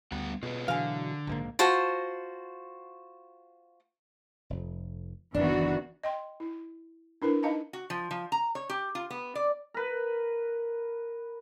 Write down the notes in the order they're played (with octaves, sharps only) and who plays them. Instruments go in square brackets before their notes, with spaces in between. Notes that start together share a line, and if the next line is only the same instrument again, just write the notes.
[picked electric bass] D2 [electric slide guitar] G3 B3 F#5
[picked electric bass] B2 [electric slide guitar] F4 G#4 B4
[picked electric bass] B2 E3 F#3 [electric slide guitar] D3 [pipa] G#4 F5
[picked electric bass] A#1 G#2 A#3
[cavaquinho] F4 F#4 C5 A5
[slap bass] F1 F2
[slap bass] F#1 D2 [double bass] D#3 B3 [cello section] E3 F#4 [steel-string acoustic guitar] D4
[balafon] D#5 G5 C6
E4
D4 E4 A#4 B4
D#4 D#5 F5 A5 A#5
[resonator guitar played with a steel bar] F#4
F3
F3
A#5
C#5
G4
F4
B3
D5
[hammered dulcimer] A#4 B4